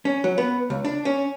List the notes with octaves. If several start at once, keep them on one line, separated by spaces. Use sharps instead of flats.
C#4
F#3
B3
C#2
D4
C#4